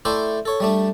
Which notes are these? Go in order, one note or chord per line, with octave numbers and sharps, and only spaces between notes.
A3 E4 A4 C5 D5 G5
A4 C#5
G3 A3 D4